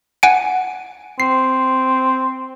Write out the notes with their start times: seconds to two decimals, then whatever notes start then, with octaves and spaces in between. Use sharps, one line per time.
0.23 F#5 G#5 D7
1.20 C4 C7